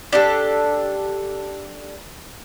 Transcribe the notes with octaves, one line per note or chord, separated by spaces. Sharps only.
D4 G4 A4